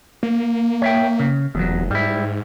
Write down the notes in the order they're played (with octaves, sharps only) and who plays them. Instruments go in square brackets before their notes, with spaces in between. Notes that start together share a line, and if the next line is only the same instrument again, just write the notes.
[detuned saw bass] A#3
[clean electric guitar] C#5 E5 G5
C#3
[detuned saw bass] F1 [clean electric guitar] E2 F#3
[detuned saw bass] G#2 [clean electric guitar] G3 E4